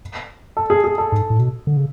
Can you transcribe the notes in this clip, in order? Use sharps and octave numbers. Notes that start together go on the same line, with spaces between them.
A4
G#4
G#4
A4
G#2
A2
B2
D3
C#3